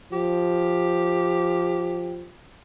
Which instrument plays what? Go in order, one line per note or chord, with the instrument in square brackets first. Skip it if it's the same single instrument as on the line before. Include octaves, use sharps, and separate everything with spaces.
[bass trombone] F3 [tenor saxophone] G4